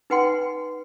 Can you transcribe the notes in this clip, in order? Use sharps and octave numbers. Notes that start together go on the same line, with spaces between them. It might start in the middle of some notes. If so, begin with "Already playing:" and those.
D#4 B4 F#5 G5 C6